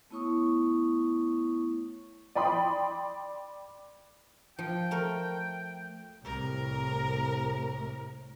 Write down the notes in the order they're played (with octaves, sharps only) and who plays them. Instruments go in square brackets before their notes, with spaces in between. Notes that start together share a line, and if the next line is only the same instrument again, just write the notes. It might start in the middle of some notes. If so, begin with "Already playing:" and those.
[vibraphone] A3 B3 E4 C#5 C#6 D#6
[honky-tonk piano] D5 G5 B5 C6 D#6
[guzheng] F3 [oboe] G5
[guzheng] A3 A#4
[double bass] C2 A2 [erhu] A#4